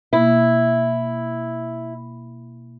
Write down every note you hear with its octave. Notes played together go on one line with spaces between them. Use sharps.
B2 A#3 E4